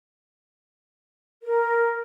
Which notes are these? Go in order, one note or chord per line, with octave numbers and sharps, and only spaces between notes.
A#4